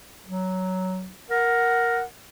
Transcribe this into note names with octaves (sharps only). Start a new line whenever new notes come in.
F#3
A#4 F#5